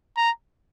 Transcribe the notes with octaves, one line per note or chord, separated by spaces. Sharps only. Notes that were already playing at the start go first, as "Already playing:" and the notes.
A#5